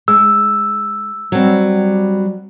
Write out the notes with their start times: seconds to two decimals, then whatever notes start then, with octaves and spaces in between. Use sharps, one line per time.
0.08 G#3 E6
1.32 F#3 G3 C4